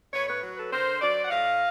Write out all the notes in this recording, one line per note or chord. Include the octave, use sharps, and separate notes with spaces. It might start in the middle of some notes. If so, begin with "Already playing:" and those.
A2 B4 C#5
B4 C#5
F#3
A4 B4
D3 A#4 C5
F#3 C5 D5
F#5
A2 D#5 F5